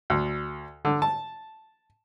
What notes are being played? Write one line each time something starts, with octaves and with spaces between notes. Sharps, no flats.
D2
D3
A5